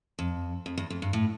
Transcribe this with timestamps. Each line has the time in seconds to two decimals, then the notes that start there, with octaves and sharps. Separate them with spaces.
0.19 F2
0.66 F2
0.77 E2
0.90 F2
1.02 G2
1.13 A2